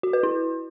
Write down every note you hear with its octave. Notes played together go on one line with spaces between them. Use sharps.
F#4
B4
E4